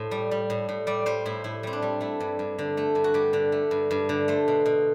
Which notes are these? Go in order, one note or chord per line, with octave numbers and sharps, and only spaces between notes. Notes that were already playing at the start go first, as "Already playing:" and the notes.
Already playing: A2 C5
G3
G3
A2
A2
G3 D5
G3 C5
A2 E4
A2 E4
G3 C4
D4
G3
A3 E4
G2
G2
D3
A3
G2
F#4
G2 G4
D3
A3
G2
G2
D3
A3 C5
B2
B2